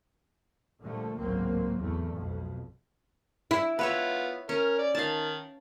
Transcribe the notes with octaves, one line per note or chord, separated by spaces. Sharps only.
A#2 D3 F3 G3 A3
G#1 C#2 A2 F#3 A#3 C4
E2 A3
B1 F2 B2
E4
B3 F4 B4 C#5 E5
C#4 A#4
D5
D#3 F5 A5